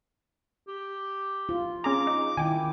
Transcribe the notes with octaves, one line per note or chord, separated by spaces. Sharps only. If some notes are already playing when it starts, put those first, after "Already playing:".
G4
F4
C#4 G#4 A#5 D6
D#4
D#3 E4 G5 G#5 D6